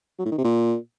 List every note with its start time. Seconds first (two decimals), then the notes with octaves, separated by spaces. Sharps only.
0.19 F#3
0.25 A2
0.32 D#3
0.38 C3
0.44 A#2